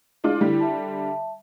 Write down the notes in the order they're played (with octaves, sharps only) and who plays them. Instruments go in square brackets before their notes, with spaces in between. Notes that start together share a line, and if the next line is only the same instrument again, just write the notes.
[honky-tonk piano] G#3 D4 F4 [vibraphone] E4
[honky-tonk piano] D3 G3
[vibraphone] E5 A5